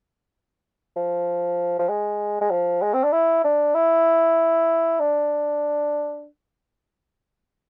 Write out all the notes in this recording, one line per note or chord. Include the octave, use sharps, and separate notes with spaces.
F3
F3
G#3
G#3
F3
G#3
C4
D4
E4
D4
E4
D4